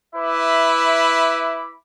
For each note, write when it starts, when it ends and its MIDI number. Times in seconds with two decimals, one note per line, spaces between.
0.15 1.75 64
0.15 1.75 71
0.15 1.75 76
0.15 1.75 83
0.15 1.75 86